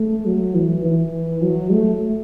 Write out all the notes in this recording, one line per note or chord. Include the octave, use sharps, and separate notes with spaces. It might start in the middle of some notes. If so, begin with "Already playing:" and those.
Already playing: A3
F#3
E3
E3
F#3
A3